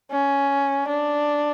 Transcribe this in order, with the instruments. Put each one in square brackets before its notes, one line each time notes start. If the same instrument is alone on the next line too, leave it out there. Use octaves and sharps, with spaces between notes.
[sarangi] C#4
D4